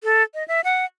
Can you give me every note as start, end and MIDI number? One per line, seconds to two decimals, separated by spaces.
0.04 0.23 69
0.34 0.46 75
0.48 0.61 76
0.64 0.85 78